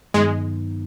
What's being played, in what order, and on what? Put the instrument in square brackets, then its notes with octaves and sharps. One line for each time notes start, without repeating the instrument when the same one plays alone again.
[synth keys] G2 D#3 F#3 B3 D#4 [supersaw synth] G#3